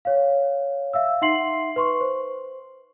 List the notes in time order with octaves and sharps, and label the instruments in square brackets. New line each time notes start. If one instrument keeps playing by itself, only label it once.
[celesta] C#5 F5
E5 F5 E6
D#4 E5 F#5 C6 C7 F#7
B4 C6 C#6
C5